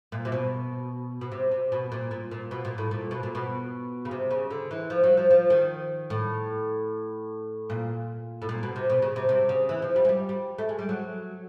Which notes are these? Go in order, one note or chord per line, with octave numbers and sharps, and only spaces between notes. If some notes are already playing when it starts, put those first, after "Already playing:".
A#2
C3
B2
B2
C3
C3
B2
A#2
A#2
A#2
B2
A#2
A2
A#2
B2
A#2
B2
C#3
C3
C#3
D3
E3
F3
F#3
F3
F3
D#3
A2
A#2
A2
A#2
B2
C3
B2
C#3
C3
C3
C#3
E3
F3
G3
G#3
G3
G3
A3
G#3
G3
F#3